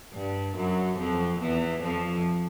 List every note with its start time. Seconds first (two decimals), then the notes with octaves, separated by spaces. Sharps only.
0.14 G2 G3
0.56 F#2 F#3
0.98 F2 F3
1.40 E2 E3
1.82 F2 F3